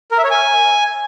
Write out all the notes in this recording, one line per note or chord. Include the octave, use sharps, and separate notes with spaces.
A#4
E5
C#5
G#5